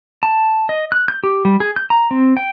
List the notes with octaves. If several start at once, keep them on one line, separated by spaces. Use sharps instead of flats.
A5
D#5
F#6
G6
G4
G3
G#4
G6
A#5
C4
G5